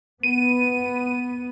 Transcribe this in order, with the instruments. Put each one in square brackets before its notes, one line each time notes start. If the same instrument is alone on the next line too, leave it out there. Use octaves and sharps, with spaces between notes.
[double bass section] B3 [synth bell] D#7